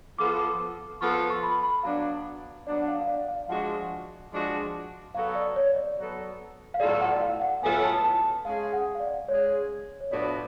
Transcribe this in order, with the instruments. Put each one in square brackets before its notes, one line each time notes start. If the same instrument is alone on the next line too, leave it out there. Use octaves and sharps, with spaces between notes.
[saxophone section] F3 B3 F4 A4 [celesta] D6
[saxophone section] F3 B3 F4 A4 [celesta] C#6
[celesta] C#6
B5
B5
[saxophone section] F#3 B3 D4 [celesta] F5
[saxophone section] F#3 B3 D4 [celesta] D5
[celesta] F#5
F5
F5
D5
F5
[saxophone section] F3 G#3 D4 F#4 [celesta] F#5
[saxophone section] F3 G#3 D4 F#4
[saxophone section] F#3 B3 F#4 A4 [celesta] F5
[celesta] D5
C#5
D5
[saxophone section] F#3 B3 F#4 A4
[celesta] F5
[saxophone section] A2 F#3 B3 F4 A4 [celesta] D5
[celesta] F#5
D5
F5
F#5
[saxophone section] A2 F#3 B3 F4 A4 [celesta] G#5
[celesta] A5
A5
[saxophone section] G#3 C#4 G#4 [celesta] F5
[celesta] F#5
F5
D5
[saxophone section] G#3 C#4 G#4 [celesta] C#5
[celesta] C#5
[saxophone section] A2 F3 B3 D4 F#4 [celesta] D5